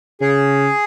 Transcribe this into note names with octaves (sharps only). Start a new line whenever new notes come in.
C#3 G#4